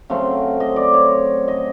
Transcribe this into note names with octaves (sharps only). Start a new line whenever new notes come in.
C#3 F#3 A3 C4
D#5
D5
C#5
D#5